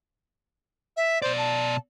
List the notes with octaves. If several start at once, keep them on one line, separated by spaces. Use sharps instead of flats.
E5
B2 C5 D5
A5